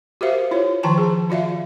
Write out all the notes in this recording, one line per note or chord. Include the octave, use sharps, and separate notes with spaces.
F#4 G4 A#4 C5 E5 F5
E4 F4 C#5
D#3 F3 G5 A5 A#5
G#4
F4 F#4 D5 E5 F5